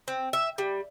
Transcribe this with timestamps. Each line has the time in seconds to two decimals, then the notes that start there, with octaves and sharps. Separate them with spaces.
0.08 C4
0.33 E5
0.58 G3